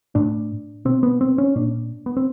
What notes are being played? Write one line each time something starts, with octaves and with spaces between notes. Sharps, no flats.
A2 D4
B2 C4
B3
C4
C#4
A#2 D4
B3
C4